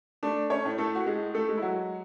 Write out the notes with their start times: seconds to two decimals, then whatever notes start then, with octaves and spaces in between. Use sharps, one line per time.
0.23 A3 D4 D5
0.50 C#4 C#5
0.65 A2
0.78 A3 A4
0.95 F#4
1.06 G#3 G#4
1.34 A3 A4
1.48 G#3
1.57 E4
1.62 F#3 F#4